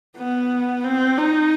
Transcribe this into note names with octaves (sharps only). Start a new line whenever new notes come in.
B3
C4
D#4